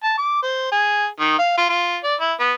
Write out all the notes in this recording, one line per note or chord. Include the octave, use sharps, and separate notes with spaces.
A5
D6
C5
G#4
D#3
F5
F4
F4
D5
E4
B3